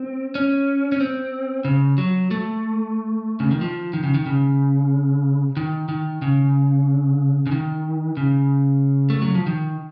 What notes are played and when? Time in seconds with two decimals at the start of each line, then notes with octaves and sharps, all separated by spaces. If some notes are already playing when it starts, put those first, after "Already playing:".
Already playing: C4
0.35 C#4
0.92 C#4
1.01 C4
1.65 C#3
1.98 F#3
2.31 A3
3.40 C#3
3.51 D#3
3.61 F3
3.93 D#3
4.03 C#3
4.14 D#3
4.26 C#3
5.57 D#3
5.89 D#3
6.22 C#3
7.47 C#3
7.52 D#3
8.17 C#3
9.10 A3
9.22 F#3
9.35 F3
9.47 D#3